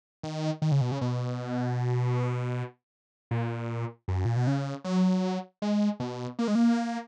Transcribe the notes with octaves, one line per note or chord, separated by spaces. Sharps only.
D#3
D#3
C#3
B2
C#3
B2
A#2
F#2
A#2
B2
C#3
F#3
G#3
B2
A#3
G#3
A#3